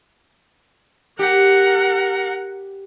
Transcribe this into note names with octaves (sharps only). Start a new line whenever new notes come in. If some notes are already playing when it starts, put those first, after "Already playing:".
G4 A#4 F#5